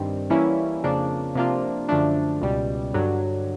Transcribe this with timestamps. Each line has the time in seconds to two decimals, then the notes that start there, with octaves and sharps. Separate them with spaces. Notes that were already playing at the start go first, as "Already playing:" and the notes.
Already playing: G2 D#3 G3 C4
0.30 E3 G3 A#3 C#4 E4
0.83 F2 C#3 F3 A#3 D4
1.35 C3 F3 A#3 D4 F4
1.89 F#2 D3 F3 A3 D4
2.41 C#2 B2 G3
2.94 G2 D3 F#3